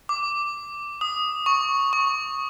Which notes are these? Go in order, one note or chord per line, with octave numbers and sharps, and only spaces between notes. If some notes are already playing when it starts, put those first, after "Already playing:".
D6
D#6
C#6
C#6